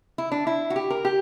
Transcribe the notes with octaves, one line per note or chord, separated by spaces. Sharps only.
E4
D4
E4
F#4
G4
A#4
G4